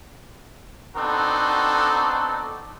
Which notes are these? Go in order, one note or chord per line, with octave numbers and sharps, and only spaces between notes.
B3 C4 D4 D#4 F#4 A4